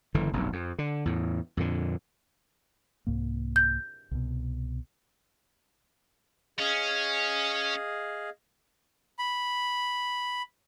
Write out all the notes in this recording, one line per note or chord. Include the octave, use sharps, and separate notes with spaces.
F#1 D3 E3
F1 B1 G2
F2
D3
E2 A2
F2 A#2 D3
C2 G#2 A#3
G6
C2 B2
C#4 G#4 D#5 F5
B5